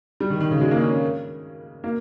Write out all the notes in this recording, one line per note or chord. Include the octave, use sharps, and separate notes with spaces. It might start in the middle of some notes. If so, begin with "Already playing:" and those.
G3
D#3
D#3
C#3
G#3
A#3
C#4
A#3